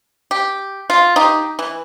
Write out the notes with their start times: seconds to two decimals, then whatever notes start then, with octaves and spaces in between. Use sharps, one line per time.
0.31 G4
0.90 F4
1.16 D#4 G4
1.59 E3